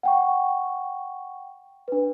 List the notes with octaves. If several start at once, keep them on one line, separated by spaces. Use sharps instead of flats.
F#5 G5 C#6
D4 B4